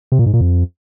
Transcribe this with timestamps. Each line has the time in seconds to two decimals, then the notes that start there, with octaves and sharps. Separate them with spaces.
0.12 C3
0.19 A#2
0.26 G#2
0.34 A#2
0.41 F2